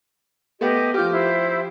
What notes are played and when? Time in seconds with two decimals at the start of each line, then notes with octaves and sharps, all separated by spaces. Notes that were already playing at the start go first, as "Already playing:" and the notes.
0.61 A3 B3 G4 D#5
0.94 F3 G4 D6 F6 G6
1.12 E4 C5